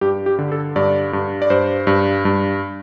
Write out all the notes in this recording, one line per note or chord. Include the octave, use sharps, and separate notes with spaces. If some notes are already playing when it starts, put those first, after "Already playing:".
G2 G4
G4
D3
A4
G2 D5
G2
D5
G2 C5
G2
G2